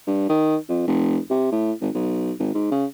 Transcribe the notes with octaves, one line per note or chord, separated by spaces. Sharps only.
G2
D#3
F2
F1
C3
A2
G#1
B1
G#1
G#2
C#3